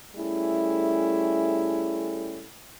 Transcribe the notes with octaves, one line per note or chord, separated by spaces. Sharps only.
G3 A3 C#4 E4 G#4 A4